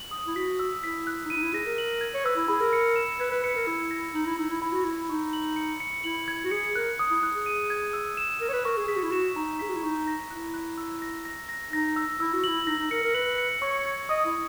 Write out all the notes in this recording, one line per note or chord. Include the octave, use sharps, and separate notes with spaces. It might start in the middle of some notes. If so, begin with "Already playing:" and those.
Already playing: F#7
D#6
E4
F#4 B6
E6
E4 B6
F#6
D#4
E4 D#7
D#4
E4
G#4 A#6
A#4
F#7
G#6
C#5
B4 E6
E4
G#4 B5
A#4
C#7
E7
B4 G#6
B4
B4 C#7
A#4
E4 E6
A#6
D#4 F#7
E4
D#4 E6
E4
E4 B5
F#4
E4 B5
D#4 C#6
F#7
C#7
C#7
E4 F#7
G#6
F#4
G#4 C#7
A#4 F#6
D#6
E4
F#6
G#4
D#7
G#6
E6
E7
A#4 E7
C#5
B4
A#4 C#6
G#4
G#4 B6
F#4
E4
F#4 E7
D#4 A#5
G#4 B6
F#4
E4
D#4 C#6
A#6
E4 F#6
F#6
E6
A#6
A#6
A#6
D#4 A#6
E6
E4 E6
F#4
E4 F#7
D#4 A#6
D#4
A#4 C#7
A#4
B4 F#7
C#7
C#5 C#6
G#6
D#5 D#6
E4